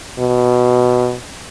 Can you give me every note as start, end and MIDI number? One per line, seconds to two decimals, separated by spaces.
0.19 1.16 47